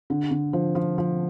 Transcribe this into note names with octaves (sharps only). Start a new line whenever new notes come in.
D3
D3
F3
F3
F3